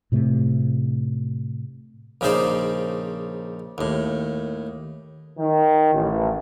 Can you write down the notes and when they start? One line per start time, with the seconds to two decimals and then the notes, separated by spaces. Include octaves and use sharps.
0.12 A2 C3 A3
2.21 A#1 C#3 C#4 D#4 C5 D5
3.78 D#2 A2
5.37 D#3
5.93 A1